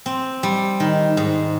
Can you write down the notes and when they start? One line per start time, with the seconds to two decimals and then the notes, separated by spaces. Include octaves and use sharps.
0.06 C4
0.43 G3
0.80 D#3
1.17 G#2